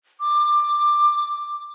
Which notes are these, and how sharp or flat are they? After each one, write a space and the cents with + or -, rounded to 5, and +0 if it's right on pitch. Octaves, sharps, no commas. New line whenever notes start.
D6 +20